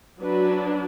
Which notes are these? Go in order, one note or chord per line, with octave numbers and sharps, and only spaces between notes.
F#3 D4 F#4 B4